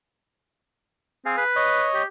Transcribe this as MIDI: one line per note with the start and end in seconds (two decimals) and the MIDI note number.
1.26 1.34 60
1.26 1.44 68
1.26 1.44 77
1.38 1.86 71
1.56 2.02 73
1.56 2.02 75
1.95 2.06 67